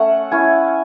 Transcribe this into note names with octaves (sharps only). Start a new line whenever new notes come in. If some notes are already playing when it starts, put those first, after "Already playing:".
Already playing: A3 C#4 F#5
C#4 E4 G#5